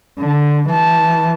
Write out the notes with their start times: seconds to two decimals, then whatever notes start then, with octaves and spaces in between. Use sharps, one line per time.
0.19 D3
0.71 E3 A5